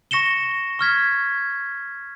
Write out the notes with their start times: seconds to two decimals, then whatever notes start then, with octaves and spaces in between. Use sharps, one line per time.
0.11 C#6 A#6 C#7 E7 G7
0.79 C#6 F6 G#6 B6